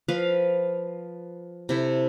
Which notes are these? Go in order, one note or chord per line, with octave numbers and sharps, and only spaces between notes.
F3 B4 F5
C3 E4 A4